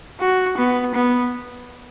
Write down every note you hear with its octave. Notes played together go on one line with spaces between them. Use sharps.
F#4
B3
B3